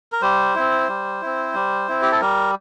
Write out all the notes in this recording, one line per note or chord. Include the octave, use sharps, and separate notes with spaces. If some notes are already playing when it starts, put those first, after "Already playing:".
A#4
G3 C5
C4 E4
G3
C4 E4
G3
C4 E4
G4
A4
G3 A#4